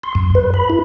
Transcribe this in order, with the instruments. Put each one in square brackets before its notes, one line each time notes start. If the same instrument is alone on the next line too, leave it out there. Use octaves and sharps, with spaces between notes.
[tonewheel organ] C6
F#2
B4
B5
E4